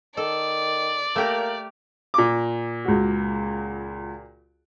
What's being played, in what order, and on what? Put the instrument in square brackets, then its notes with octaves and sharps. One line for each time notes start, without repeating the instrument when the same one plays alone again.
[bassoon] D#3 [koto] A4 [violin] D5
[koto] A3 G4 A#4 [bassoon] A#3
[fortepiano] A#2 D6
[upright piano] C#2 F#4